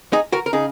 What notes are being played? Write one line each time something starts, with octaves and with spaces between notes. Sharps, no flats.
D#4 G#4
F#4 A#4
A#4
C#3 D#4 G#4